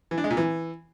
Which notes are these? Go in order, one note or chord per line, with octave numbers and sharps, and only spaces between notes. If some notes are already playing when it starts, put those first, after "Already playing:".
E3
D4
G#3
A#2
E3